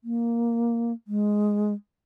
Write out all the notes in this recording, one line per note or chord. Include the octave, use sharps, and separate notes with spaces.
A#3
G#3